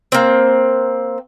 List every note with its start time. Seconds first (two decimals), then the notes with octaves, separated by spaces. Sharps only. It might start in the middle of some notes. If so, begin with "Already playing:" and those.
0.12 A#3 C4